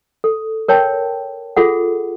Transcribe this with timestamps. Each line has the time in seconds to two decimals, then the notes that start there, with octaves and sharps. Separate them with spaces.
0.24 A4
0.68 A#4 C#5 G5 A5
1.57 F4 G#4 A4 F#5